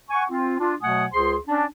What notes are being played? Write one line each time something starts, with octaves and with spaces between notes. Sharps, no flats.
F#5 G#5 C#6
C4 F4
D4 F4
B2 F#3 A3 F#5 G#5 D#6
C#2 G#4 C5 C6
C#4 D4